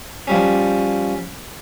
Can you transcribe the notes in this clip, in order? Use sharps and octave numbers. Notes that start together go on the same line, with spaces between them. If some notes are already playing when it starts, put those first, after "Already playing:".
F3 G3 C#4